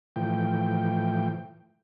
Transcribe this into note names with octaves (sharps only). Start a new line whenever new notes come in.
A2 E3 F3 G5